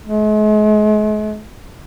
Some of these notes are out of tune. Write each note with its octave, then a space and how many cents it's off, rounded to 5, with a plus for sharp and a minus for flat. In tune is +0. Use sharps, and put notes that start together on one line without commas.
G#3 +45